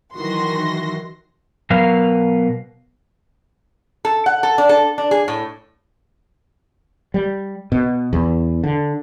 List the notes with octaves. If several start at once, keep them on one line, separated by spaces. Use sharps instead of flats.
D#3 E3 F#3 F#4 C6 A#6
B2 F#3 A#4 B4 F5
A4
F#5
A4
D4
A4
D4
G#4
A2
G3
B2
E2
D3